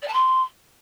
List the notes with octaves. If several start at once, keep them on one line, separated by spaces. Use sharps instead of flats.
D5
A5
C6